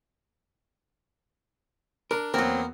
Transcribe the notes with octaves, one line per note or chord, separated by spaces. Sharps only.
D4 A#4
E2 F#3 A#3 C4 A#4